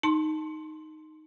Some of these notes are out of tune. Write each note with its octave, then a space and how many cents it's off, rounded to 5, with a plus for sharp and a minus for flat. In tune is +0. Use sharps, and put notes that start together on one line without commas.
D#4 +0 A5 +0 C6 +0